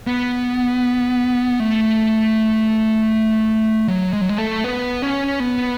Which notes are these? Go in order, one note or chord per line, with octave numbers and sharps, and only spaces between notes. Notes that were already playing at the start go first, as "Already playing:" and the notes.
B3
A3
F#3
G#3
F#3
G#3
A3
B3
C#4
B3